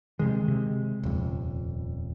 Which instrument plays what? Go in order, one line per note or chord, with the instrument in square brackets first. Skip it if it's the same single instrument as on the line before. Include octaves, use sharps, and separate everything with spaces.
[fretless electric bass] C3 D#3 [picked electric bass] G#3
[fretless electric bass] C3
[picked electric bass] D#1 F2